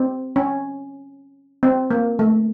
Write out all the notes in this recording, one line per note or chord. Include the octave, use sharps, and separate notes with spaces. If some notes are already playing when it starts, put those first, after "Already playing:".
Already playing: C4
C#4
C4
A#3
A3